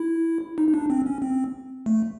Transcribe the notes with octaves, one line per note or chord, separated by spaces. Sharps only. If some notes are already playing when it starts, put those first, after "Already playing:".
Already playing: E4
D#4
D#4
D4
C4
C#4
C4
A3